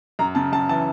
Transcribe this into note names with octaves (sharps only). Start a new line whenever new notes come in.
F#2 A#5
C#3 A5
F#2 A5
E3 A5